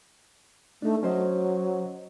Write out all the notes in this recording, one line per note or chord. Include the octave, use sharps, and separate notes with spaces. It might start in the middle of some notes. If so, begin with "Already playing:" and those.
A3 D4 D#4
F#3 C#4 C5 D#5